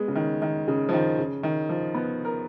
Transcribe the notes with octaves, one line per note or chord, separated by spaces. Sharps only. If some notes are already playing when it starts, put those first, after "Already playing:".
Already playing: G#3 B3
C#3
D#3
D#3
C#3
F3
D#3
C#3
D#3
F3
B3
A#4